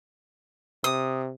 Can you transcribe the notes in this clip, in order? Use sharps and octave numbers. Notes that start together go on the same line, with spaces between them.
C3 D#6